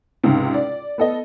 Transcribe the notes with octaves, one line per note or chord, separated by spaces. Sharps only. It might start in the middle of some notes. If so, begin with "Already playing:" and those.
C#2 G#2 C3
D5
B3 A4 D#5